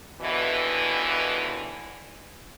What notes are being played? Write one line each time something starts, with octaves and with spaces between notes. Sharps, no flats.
D#2 B2 D3 E3